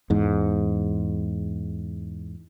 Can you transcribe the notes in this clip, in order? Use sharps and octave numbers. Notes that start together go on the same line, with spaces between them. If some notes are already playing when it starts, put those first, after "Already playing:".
E2 G#2